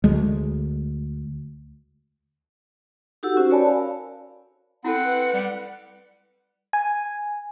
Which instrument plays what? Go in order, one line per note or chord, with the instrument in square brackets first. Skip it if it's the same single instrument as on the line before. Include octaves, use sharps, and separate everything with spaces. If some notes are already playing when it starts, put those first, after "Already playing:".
[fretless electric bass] D2 G#3
[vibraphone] D#4 F#4 G4 A4 F#5 E6
C#4 F#4 C5
A#4 C#5 D5 G#5 A5 B5
F5
[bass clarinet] C4 [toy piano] E4 F4 A4 [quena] F#5
[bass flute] B4
[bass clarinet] G3
[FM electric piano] G#5